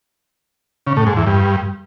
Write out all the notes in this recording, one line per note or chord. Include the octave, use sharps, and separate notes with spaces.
C#3
A2
G#2
E2
G2